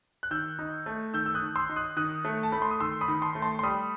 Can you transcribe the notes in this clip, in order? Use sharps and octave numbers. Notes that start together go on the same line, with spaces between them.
F#6
D#3 E6 G6
D#4
A3
D#3 E6 G6
E6
D#6 F#6
D#3
C6 E6
D#4
D#6 F#6
D#3 D#6 F#6
A3
A5
A3 B5
C6
D#6
D#3 C6 E6
B5 D#6
D#3
A5 C6
A3
A5 C6
C6
G3 B5 D#6